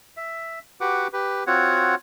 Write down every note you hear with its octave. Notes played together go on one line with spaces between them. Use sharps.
E5
F#4 G4 B4 F#5 D6
G4 B4
C4 F4 F#4 C#5 F#5